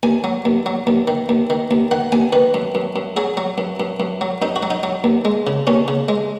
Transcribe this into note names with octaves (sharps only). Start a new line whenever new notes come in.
D#2 G#5
F#3
D#2
F#3
D#2
D#3
D#2
D#3
D#2
D#3 F#5
D#2 G#5
D#3 B4
F#2
F#2
F#2
F#3 G#4
F#3
F#2
F#2
F#2
F#3
F#2 D#4
F#4
F#3
D#4
F#3
D#2
G#3
C#3
D#2 C#4
C#3
G#3